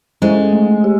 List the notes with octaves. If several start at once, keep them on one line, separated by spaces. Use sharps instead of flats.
G#3 C#4 E4 A4 C5
A3
G4